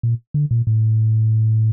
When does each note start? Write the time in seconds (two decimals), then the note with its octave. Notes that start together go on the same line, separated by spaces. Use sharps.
0.03 A#2
0.34 D3
0.51 A#2
0.67 A2